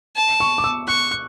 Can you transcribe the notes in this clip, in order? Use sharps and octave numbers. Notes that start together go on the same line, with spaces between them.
A5
C#6
D6
E6
C#6 F#6
F#6